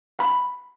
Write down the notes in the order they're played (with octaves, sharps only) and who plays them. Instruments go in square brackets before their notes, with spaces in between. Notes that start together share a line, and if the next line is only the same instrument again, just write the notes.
[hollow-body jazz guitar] B5